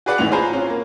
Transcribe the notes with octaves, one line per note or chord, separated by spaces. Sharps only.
F#4 G#4 B4 D5 F#5
A1 A2 E3 G#3 F7
F4 G#4 C5 G#5 A#5 B5
C4 C#4 F4
A#3